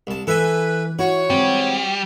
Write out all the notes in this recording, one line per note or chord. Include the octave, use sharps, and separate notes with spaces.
C2 A5
E3 A4 B4 E5 G#5
E4 F#4 C#5
G3 G#3 C4